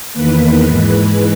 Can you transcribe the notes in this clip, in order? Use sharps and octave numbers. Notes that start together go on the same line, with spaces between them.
E2 D#3 A#3 B4
G#2 E3 G#3